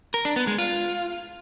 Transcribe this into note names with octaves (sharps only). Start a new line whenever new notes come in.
A#4
D4
B3
G#3
F4